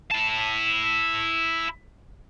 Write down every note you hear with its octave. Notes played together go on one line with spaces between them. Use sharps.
E4 A5